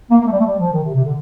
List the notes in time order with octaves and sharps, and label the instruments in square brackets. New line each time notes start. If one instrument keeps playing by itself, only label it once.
[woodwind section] A#3
A#3
A3
G3
A3
G3
F3
D#3
C3
C3
D3